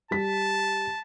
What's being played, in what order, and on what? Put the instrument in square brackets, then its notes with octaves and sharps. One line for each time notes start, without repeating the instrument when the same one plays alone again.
[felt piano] G3 B6 [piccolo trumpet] A5